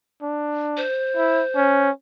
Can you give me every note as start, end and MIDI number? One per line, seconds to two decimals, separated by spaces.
0.23 0.85 62
0.77 1.89 72
1.16 1.42 64
1.56 1.91 61